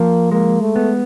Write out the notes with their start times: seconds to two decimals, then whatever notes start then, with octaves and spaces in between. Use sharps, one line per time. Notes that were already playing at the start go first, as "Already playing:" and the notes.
Already playing: F3 A#3
0.32 G#3 A#3
0.61 A3
0.76 B3